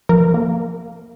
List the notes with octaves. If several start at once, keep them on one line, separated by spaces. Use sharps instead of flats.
F3 A#4
A#3